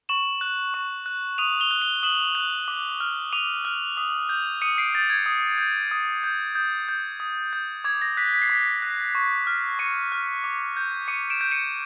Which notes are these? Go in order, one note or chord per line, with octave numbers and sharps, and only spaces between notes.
C#6 E7 F#7
F#6
C#6
F#6
D#6 D#7 F7
F7 G7
F#6
F7 G7
D#6 E7 F#7
F#6
D6
F6
D6 D#7 F7
F6
D#6
G6
D#6 C#7 D#7
C7 D7
G6 A6
G#6
D#6
G6
D#6
G6
D#6 G6
G6
D#6
G6
D6 G#6
A#6
F#6 B6
B6
C7
D6 B6
F#6
C#6
F6
C#6 C#7 D#7
F6
D6
G6
D6 C#7 D#7
D7 E7
G6
C#7 D#7